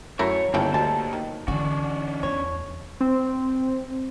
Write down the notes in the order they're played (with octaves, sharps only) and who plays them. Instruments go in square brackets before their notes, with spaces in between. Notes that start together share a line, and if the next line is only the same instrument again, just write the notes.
[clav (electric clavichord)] F#2 A3 E4 [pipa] A#4 [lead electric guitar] C#5
[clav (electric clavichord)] G1 C#3 G5 [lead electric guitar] A#3 G4 [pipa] C4 E4 A4
[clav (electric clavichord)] D2 [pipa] A5
[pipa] D#3
[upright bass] D3 E3 [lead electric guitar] C#4 D4 [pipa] F#4
[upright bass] E2 [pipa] C#5
[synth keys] C4